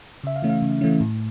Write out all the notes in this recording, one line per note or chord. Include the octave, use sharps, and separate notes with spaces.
C#3 E5
F5
E3 A3 C#4
F5
C#3
E3 A3 C#4
A2